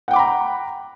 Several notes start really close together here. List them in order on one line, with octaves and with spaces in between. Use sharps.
F#5 G5 D6 B5 A#5